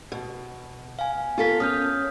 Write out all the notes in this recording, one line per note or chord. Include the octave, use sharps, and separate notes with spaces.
B2
F5 G#5
B3 F4 A4 A#4 B6
C#4 D#6 F6 G6